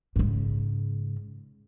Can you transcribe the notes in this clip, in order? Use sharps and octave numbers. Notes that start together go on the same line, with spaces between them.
G#2 C#3